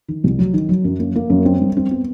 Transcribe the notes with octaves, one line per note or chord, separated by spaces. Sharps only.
D#3
C2
F#3
D#3
F#3
F#2
A#3
A#3
F#2
C4
G3
C4
B3